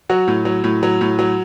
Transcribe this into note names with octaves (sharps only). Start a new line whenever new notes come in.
F#3 F#4
A2
F#3
A2
F#3
A2
F#3